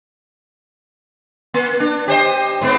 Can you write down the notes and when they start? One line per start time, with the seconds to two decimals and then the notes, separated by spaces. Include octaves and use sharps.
1.54 A#3
1.80 D4
2.08 G4 C5 D#5
2.61 G#2 B3 C4